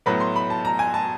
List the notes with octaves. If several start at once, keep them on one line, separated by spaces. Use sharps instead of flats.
A2 F#3 B3 B5
C6
B5
A5
A#5
G#5
A5